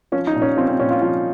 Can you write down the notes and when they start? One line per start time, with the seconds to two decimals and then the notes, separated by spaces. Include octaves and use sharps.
0.12 F3 C#4
0.27 D#4
0.35 A#2
0.42 C#4
0.57 F3 C4
0.68 C4
0.80 A#2 C#4
0.91 F4
1.02 F3 F4